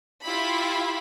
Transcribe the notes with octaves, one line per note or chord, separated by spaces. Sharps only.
E4 F4 G4 B5